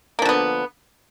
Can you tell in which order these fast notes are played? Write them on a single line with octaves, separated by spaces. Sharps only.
A#3 F3 D3 B3